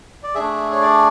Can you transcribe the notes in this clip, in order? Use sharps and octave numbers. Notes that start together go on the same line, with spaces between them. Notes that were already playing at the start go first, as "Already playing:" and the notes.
D5
A3 D4 G#4 E5
C#5
D5